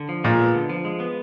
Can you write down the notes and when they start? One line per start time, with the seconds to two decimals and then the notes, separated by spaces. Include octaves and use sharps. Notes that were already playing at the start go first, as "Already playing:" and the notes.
Already playing: D3
0.09 F3
0.24 A#2 G#3
0.39 B3
0.54 D3
0.69 F3
0.85 G#3
1.00 B3